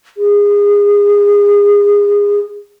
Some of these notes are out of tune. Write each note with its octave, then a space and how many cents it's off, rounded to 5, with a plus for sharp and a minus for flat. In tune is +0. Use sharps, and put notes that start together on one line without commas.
G#4 -25